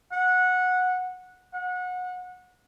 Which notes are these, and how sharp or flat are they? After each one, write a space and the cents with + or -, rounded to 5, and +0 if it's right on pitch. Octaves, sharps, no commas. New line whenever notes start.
F#5 -15
F#5 -25